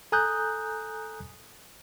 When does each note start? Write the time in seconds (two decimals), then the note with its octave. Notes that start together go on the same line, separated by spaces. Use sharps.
0.12 A4 G#5 A#5 D#6 F#6 G6